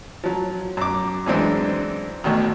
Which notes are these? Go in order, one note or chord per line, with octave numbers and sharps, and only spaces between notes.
F3 F#3
F#2 D6
F#2 E3 G#3 C4 D4
A1 D2 B2 D#3